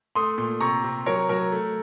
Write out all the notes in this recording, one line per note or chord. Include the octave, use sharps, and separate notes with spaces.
A3 C6 D#6
A#2
C3 A#5 C#6
C3
F#3 A#4 C#5
F#3 A#4
A3